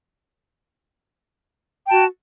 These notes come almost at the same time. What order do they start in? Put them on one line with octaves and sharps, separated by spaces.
G5 A5 F#4